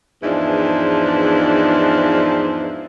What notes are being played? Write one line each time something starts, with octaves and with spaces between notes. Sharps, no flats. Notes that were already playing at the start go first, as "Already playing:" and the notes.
E2 G#2 E3 F3 D4 D#4